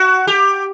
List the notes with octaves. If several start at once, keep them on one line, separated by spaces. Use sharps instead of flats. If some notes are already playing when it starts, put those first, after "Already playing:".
Already playing: F#4
G4